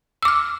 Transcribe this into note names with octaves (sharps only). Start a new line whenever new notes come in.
D6 E6 F6